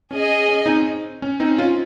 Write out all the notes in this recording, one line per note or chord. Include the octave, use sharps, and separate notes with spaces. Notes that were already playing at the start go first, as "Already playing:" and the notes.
C#4 G#4 D#5 G#5
C#4
C4 D#4
C#4
C4 D#4
C#4 F4